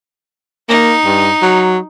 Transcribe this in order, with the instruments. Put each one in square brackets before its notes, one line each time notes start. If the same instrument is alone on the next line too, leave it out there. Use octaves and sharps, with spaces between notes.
[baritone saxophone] A#3 [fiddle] D#4
[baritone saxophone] G2
F#3